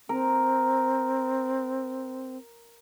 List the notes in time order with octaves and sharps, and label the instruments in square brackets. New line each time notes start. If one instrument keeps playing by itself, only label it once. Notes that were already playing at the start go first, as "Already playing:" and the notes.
[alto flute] C4 [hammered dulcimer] A#4